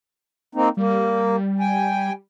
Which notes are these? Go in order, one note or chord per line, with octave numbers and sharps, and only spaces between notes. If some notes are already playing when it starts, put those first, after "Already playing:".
A#3 C4 D#4
G3 A#3
G5 G#5